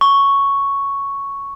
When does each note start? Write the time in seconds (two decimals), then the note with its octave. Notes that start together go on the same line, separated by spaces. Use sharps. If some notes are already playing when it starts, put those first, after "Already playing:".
0.01 C#6